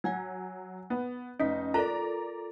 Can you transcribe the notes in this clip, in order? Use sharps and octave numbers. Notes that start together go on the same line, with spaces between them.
F#3 F#5 G#5 G#6
B3
F1 C#4 D#4 B6
F4 A4 A#4 D5 A#5